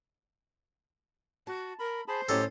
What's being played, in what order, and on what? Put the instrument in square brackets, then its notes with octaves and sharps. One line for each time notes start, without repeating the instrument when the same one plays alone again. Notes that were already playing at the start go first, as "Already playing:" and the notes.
[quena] F#4 [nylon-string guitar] A5
[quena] A#4 [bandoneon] B5
[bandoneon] G#4 A5 B5 [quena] C5
[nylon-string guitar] A2 C#4 D#5 [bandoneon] F#3 G4 [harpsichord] A4